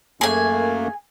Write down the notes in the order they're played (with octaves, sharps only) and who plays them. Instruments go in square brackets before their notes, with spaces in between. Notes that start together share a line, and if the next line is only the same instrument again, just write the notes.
[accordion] F#2 A3 A#3 [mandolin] G#4 G#5